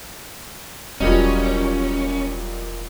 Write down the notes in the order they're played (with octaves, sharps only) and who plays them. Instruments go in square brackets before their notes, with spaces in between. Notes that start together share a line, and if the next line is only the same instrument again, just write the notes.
[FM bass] E1 [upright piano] A#2 D#5 [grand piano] F#3 G3 [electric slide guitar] C#4